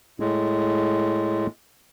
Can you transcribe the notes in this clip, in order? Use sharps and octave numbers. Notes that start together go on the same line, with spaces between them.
A2 G#3